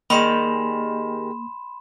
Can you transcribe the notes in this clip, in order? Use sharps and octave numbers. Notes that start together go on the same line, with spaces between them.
D#3 G3 G#3 A#3 B5 C6 E7